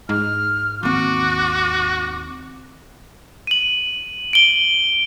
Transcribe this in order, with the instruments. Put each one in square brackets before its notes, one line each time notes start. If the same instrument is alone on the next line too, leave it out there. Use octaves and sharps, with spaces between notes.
[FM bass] G#2 [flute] F6
[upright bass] D#2 C4 [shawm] F#4 [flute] D6
[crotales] D#7 F#7
D7 G7